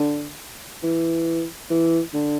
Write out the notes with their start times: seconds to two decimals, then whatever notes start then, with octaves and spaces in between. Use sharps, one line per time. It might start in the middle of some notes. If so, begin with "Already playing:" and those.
Already playing: D3
0.83 E3
1.70 E3
2.14 D3